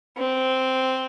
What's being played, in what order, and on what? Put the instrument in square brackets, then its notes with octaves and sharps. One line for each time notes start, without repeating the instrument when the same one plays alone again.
[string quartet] C4